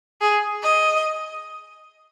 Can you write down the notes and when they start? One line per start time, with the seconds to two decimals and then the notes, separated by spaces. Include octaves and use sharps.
0.21 G#4
0.62 D#5